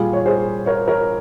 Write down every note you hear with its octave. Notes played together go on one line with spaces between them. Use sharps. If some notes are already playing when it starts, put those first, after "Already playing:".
Already playing: A#2 G3 F4 G#4
C#5
G#4 C5
A#4 C#5
A#4 C#5